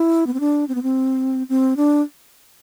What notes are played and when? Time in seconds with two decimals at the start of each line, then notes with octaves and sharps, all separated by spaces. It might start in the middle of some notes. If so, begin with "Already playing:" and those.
Already playing: E4
0.27 B3
0.34 C4
0.40 D4
0.68 C4
0.75 B3
0.83 C4
1.49 C4
1.77 D4